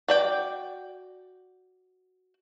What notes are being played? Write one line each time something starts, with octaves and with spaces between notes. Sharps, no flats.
F#4 D5 G5